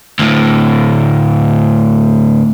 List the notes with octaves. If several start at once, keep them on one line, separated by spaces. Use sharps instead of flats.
D2 A2